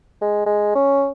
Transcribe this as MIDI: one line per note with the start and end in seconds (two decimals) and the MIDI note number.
0.22 0.46 56
0.46 0.71 56
0.75 1.10 61